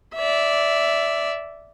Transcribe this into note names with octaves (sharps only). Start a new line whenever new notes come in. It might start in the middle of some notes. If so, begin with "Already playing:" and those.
D5 E5